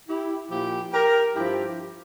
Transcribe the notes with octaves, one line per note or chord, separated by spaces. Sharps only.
E4 G4
A#2 F3 E4 G4
G4 A#4
G2 F3 E4 G4